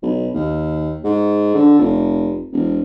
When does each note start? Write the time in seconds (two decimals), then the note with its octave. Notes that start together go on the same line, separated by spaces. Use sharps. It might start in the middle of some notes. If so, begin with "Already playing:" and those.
0.03 B1
0.34 D#2
1.04 G#2
1.55 D3
1.79 F1
2.53 E1